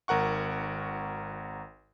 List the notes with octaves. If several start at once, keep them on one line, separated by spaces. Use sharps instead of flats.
G#1 A#4 F#5 C#6